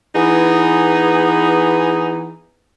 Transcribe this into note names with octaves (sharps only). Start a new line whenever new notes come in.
E3 B3 D#4 G#4